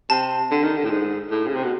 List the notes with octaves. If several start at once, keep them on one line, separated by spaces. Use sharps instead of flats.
C3 A5
D3
D#3
D3
A2
G#2
A2
C#3
C3
B2